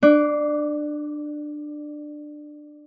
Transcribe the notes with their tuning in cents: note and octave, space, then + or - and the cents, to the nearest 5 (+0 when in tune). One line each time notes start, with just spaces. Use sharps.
D4 +20 D6 -15